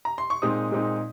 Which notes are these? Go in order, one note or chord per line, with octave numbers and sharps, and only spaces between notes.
A#5
C6
C#6
A#2 G#3 C4 D#4 D#6
A#2 G#3 C4 D#4